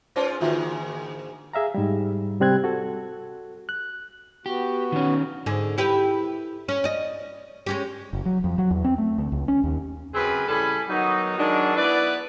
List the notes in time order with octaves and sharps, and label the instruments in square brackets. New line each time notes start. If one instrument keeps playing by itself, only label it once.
[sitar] G#2 C#4 F4 [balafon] B4 C5
[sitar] G#2 D3 A#3 [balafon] F4 F#4 E5
[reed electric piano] G#4 E5 F5 A#5
G#2 G3
C3 G3 C4 F#6 G#6
F#4 A4
F#6
[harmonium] B3 F#4 [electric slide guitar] G4
[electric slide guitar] D#3 C#4
[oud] G#2 D3 G#4
E4 G4 B4
C#4
D5 D#5
G#3 C#4 G4
[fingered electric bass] F#1
F#3
F2
F#3
E2
C4
A3
D2
C#2
C#4
D#2
[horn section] F#2 C#3 C4 G#4 B4 B5
A2 C#3 G3 A4 G#5 B5
D#3 F#3 B3 D#4
D#3 F#3 G#3 D4
B3 E4 B4 D5